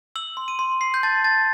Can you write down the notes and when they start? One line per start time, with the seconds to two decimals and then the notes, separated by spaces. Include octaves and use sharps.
0.16 E6 F#7
0.37 C6
0.48 D#7
0.59 C6
0.81 C6 C7
0.94 G6
1.03 A5 A6
1.24 A5 A6